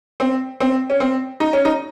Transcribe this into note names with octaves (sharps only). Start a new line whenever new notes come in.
C4
C4
C#4
C4
D#4
C#4
D#4